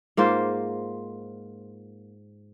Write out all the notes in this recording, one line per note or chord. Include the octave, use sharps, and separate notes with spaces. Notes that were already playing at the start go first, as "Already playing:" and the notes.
G#2 A#3 F4 C5